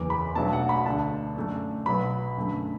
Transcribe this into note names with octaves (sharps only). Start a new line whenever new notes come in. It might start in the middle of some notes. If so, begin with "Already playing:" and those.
Already playing: F#1 E2 E3 D6
B5
B1 B2 F#3 A3 D4 A5
F#5
B5
D2 D3 A3 D4 A5
F#2 D3 A3 D4
B1 B2 F#3 B3 B5
F#2 D3 A3